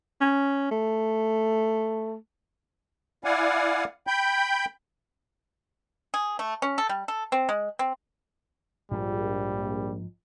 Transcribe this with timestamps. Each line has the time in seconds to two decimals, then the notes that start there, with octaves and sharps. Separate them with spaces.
0.21 C#4
0.71 A3
3.24 E4 D5 F5 F#5 G#5
4.07 G5 B5 G6
6.14 G#4
6.39 A3
6.62 C#4
6.78 A4
6.89 G3
7.08 A4
7.32 C4
7.49 G#3
7.79 C4
8.92 A#1 G#2 F3 G3